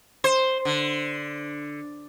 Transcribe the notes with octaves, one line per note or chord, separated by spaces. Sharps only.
C5
D3